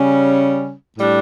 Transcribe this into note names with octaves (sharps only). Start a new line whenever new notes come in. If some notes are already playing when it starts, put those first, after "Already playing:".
Already playing: C#3 G3 C#4
A2 G3 D4